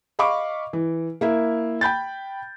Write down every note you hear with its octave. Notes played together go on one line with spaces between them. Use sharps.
D#5 F5 B5 C#6 D6
E3
A#3 E4 E5
G5 B5 G6 A6